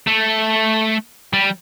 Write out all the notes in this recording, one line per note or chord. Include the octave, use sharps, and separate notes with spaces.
A3
G3